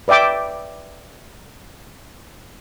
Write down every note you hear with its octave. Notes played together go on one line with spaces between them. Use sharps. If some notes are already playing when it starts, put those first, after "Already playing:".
B4 D5 E5 G5 D6